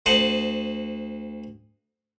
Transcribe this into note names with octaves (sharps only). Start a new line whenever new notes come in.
D2 C5 D#5 F#5 A5